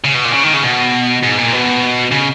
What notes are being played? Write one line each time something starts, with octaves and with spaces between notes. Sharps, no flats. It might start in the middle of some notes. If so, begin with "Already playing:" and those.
C#3
B2
A#2
C#3
D#3
C#3
B2
G#2
A#2
B2
C#3